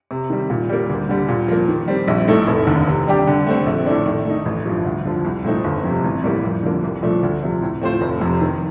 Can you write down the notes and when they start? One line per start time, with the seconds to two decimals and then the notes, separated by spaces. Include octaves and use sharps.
0.11 C3
0.30 D#3 G3
0.50 A#2
0.69 G3 A#3
0.89 D2
1.09 D3 G3
1.29 A#2
1.48 F3 A#3
1.68 D#3
1.88 G3 C4
2.08 A#1
2.28 A2 A3 D#4 A4
2.47 F1
2.67 D#2 D3
2.87 C3
3.07 G3 D4 G4
3.27 D3
3.46 A3 C4
3.66 A#1
3.86 A2 A3 D4
4.06 D#3
4.25 A3 D#4
4.45 A1
4.65 G2 F3
4.85 D2
5.05 D3 F3
5.25 C2
5.44 A#2 A3 C4 D#4
5.64 G1
5.84 F2 C3
6.04 A1
6.24 A2 G3 A#3
6.43 F2
6.63 D3 F3 A#3
6.83 C2
7.02 A#2 F3 A3 D4
7.23 D2
7.43 C3 F3
7.62 A2
7.82 A3 C4 F4 C5
8.01 F1
8.21 F2 C3
8.41 D#3